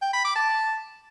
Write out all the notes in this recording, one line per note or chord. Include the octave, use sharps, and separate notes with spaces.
G5
B5
D6
A5